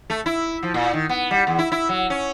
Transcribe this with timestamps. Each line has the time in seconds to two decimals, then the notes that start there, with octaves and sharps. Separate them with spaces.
0.10 A3
0.26 E4
0.63 F3
0.74 A#2
0.93 D#3
1.09 B3
1.31 G3
1.47 E2
1.59 E4
1.72 E4
1.89 F#3
2.10 C#4